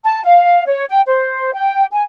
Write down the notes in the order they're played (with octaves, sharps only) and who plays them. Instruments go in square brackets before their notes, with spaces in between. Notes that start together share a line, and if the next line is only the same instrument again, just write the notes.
[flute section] A5
F5
C#5
G5
C5
G5
G#5